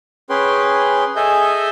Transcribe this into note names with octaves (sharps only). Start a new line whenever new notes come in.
C#4 G#4 B4 G5 C6
G#4 A4 D#5 E5 G#5 G6